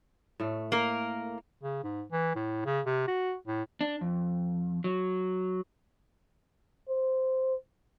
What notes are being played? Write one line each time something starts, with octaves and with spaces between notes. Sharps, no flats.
A2 A3
A#3 A#4
C#3
G#2
E3
A2
C#3
C3
F#4
A2
D4
F2
F#3
C5